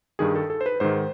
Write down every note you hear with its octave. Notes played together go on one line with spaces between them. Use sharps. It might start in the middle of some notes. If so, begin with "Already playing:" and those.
G2 D#3 G#4
A4
A4
C5
B4
G#2 D#3 C5